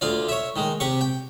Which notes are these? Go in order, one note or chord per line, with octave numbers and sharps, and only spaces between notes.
D2 F4 D5
C#5 E5
D#3 G#3
C3 G4 C#6
G5